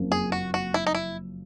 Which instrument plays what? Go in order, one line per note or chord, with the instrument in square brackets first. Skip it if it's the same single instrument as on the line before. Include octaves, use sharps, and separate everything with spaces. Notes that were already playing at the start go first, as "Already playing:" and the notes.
Already playing: [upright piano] F#1 F2 C#3 F3 A#3
[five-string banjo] G#4
F#4
F#4
E4
D#4
E4